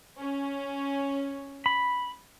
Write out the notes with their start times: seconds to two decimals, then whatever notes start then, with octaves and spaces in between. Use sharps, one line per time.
0.18 C#4
1.66 B5